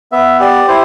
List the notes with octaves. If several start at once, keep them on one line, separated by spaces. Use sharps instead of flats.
B3 E5
G4 D5
E4 C5